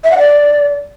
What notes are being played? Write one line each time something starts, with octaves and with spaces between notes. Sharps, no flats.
E5
F#5
D5